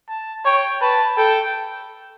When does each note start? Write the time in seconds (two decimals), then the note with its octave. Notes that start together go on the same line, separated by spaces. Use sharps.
0.09 A5
0.45 C#5 G5
0.81 B4 A5
1.17 A4 G5